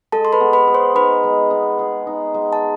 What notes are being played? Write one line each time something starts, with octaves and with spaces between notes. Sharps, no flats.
G#3 A4 A5
C6
B4 B5
B3
B4 B5
G#4
C5 C6
D#4 B4 B5
G#3
B3
G#4
D#4
G#3
A5